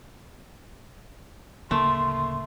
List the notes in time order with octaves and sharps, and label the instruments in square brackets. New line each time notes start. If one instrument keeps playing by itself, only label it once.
[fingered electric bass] D1 C#3 A#3 [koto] A3 [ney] C6